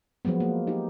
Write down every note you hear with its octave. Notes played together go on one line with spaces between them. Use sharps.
F3 F#3 G#3 B3
A#3
D#4 G4